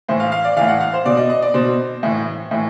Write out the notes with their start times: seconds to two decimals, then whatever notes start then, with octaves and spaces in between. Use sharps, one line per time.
0.08 A2 E3 C5
0.20 F5
0.32 F5
0.44 D5
0.56 A2 E3 F5
0.68 F#5
0.80 F5
0.93 C5
1.05 B2 D5
1.17 D#5
1.30 D#5
1.42 D5
1.54 B2 C5
2.03 A2 E3
2.51 A2 E3